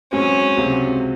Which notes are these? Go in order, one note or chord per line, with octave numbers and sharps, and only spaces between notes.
G#2 F#3 C4 C#4
C#2 C3 F#3 C4